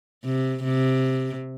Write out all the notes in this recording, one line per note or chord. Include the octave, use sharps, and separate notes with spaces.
C3
C3